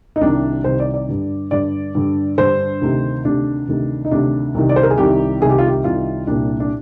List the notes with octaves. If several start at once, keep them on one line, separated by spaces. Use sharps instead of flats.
D#4
C2 C3 D#3 D4
C2 C3 D#3 C5
D5
D5
G2 D3
G2 D3 D5
G2 D3
G2 D3 C5
D2 C3 D#3
D2 C3 D#3 D4
D2 C3 D#3
D#4
D2 C3 D#3 D4
C2 C3 D#3
D5
C5
A#4
G#4
C2 C3 D#3 G4
C2 C3 D#3 G#4
G4
F4
G4
C2 C3 D#3 F4
C2 A#2 D4
D4